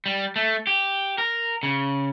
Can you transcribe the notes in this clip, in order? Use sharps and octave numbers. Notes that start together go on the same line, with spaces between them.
G3
A3
G4
A#4
C#3